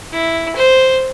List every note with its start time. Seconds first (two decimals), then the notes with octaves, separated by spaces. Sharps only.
0.13 E4
0.56 C5